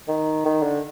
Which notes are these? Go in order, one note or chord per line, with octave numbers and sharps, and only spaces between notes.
D#3
D#3
D3